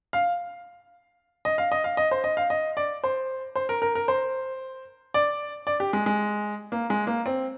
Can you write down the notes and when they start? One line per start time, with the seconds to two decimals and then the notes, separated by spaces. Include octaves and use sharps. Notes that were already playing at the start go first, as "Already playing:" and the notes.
0.13 F5
1.45 D#5
1.58 F5
1.72 D#5
1.84 F5
1.97 D#5
2.11 C5
2.24 D#5
2.37 F5
2.50 D#5
2.77 D5
3.04 C5
3.55 C5
3.69 A#4
3.82 A#4
3.95 A#4
4.08 C5
5.14 D5
5.67 D5
5.80 G4
5.93 G#3
6.06 G#3
6.72 A#3
6.90 G#3
7.07 A#3
7.26 C4